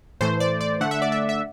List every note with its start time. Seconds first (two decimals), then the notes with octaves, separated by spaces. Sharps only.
0.21 A2 E3 A3 C5
0.40 D5
0.61 D5
0.81 D3 A3 D4 F#5
0.91 E5
1.02 D5
1.12 E5
1.29 E5